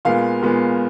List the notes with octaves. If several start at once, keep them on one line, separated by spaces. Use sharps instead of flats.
A#2 G#3 B3 F5
A#2 G#3 B3